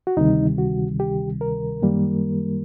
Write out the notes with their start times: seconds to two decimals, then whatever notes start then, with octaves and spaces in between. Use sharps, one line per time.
0.07 F#4
0.17 D2 C3 D#3 G3 D#4
0.58 F#4
1.00 G4
1.41 A#4
1.82 F#2 D#3 G3 A#3